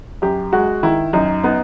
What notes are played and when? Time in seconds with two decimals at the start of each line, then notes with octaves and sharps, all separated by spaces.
0.22 F#2 G4
0.53 G#3 F#4
0.83 D#3 E4
1.13 F#2 D#4
1.44 B3 D#4